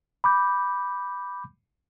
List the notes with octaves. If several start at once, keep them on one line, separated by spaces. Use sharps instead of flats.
B5 D6 G6